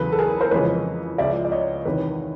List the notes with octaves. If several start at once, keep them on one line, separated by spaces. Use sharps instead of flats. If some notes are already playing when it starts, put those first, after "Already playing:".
Already playing: E2 C#3 F#3 A4 B4
A4
G#4 A#4
A#4 C5
F2 C#3 E3 G#3 B4 C#5
C#2 C#3 F3 G#3 D5 E5
D5
C#5 D#5
E2 C3 D#3 B4 C#5